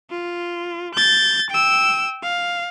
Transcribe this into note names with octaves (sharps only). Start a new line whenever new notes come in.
F4
G6 A6
G5 E6
F5